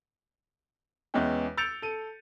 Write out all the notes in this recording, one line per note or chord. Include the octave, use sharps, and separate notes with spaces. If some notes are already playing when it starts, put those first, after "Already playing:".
E2 E3 G#3 C#4 E4 G5
E6 G6 A6 C#7 D7 F7
A4 D#7